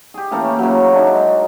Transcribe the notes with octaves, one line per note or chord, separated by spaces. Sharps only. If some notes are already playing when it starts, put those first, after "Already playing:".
G4 G#4
E3 A3 A#3 C#4
C#3 F#3
D4 D#4
G#3